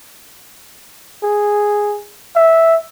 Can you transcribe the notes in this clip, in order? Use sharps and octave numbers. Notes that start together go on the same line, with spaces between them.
G#4
E5